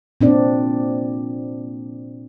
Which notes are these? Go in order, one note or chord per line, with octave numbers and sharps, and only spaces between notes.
A#2 C4 D4 D5